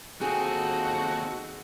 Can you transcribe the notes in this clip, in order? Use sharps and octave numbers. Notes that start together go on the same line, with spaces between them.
D#2 F3 C4 D#4 F#4 G#4 A4